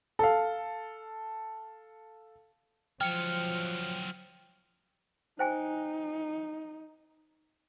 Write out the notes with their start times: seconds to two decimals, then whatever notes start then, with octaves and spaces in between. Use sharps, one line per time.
0.19 A4 F5
3.01 F3 F#3 F4 G5 F6 C#7
5.39 D#4 C5 G5 G#5